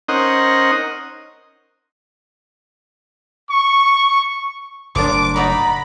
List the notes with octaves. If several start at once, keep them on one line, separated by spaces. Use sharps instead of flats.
C#4 D#4 A#4 C5 D#5 F#5
C#6
F#1 A2 F3 A#3 D4 D6
D#4 F#4 D5 A#5 B5